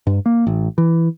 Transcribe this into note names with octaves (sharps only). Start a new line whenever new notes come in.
G2
A#3
A1
E3